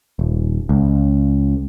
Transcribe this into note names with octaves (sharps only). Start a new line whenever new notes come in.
D#1
C#2